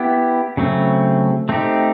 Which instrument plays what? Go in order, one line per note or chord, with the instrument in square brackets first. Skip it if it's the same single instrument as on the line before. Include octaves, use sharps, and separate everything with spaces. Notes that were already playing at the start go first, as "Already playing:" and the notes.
Already playing: [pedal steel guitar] B3 E4 G4
C#3 F#3 A3 C4
A3 C4 D#4 G4